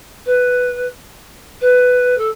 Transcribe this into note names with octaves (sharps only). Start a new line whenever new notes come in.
B4
B4
A4